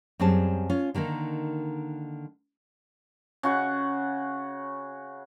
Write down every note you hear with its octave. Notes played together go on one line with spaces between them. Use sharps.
F#2 G3 C4 G#4 A5
C#4 F4
D3 D#3 A#3 D#4
C#3 F#4 F#5